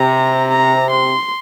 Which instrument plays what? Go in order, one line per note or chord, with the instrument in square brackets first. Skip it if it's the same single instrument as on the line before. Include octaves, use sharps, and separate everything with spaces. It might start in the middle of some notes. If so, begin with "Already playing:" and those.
Already playing: [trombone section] C3 [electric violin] A#5
[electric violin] A#5
C6